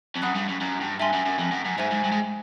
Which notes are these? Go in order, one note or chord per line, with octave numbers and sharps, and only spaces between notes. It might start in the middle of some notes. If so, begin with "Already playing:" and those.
F2
F#2 F#5 B5 D#6 F#6
G2
F#2
F#2
G2
G2 E5 G#5 C6
F#2
F#2
F2
F#2
F#2
G#2 C5 E5 G#5
G#2
G2
G#2